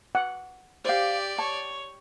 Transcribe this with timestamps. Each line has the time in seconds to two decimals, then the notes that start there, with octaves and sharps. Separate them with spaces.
0.15 F#5
0.85 G4 C5 D5 F5
1.38 C#5 A5